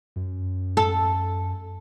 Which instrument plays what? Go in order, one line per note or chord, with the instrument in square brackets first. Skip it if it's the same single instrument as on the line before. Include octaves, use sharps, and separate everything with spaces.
[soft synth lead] F#2
[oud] A4